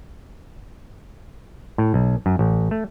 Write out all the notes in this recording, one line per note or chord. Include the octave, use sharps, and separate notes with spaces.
A2
B1
F#2
A1
A3